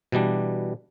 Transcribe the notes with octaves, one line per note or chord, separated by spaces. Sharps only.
B2 E3 G3 D4